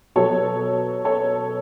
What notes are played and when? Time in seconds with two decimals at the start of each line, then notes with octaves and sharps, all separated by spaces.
0.16 B2 F#3 A4 C#5
1.05 A4 C#5